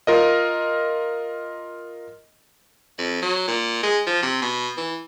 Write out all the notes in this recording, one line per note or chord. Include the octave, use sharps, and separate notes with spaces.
F4 A#4 D#5
F2
F#3
A#2
G#3
F3
C3
B2
E3